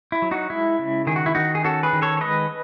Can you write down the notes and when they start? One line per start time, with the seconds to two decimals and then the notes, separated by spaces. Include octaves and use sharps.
0.12 E4
0.22 F#3
0.31 D#4 F#4
0.50 G#3 E4
0.79 C#3
1.07 D#3 G#4
1.16 F#4
1.26 E4
1.35 D#3 D#4 F#4
1.55 G#4
1.64 C#4 F#4 A4
1.83 G#4 B4
1.93 D#3
2.02 A4 C#5
2.17 C#5
2.21 G#3 B4 D#5